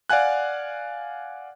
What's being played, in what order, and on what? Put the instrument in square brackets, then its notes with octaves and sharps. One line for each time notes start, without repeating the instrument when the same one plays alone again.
[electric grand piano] D5 F5 F#5 G#5 F#6